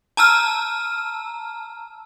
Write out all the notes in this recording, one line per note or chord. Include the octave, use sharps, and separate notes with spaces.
A5 A#5 E6 F6